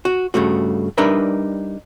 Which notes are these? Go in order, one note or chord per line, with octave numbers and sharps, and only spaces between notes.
F#4
G2 C#3 A3 F#4
G3 D4 D#4 A#4 B4 E5